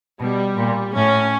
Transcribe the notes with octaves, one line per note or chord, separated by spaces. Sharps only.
B2 G3
A#2
A2 C#4